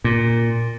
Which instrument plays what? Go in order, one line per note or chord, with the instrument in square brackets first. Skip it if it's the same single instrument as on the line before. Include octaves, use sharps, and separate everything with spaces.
[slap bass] A#2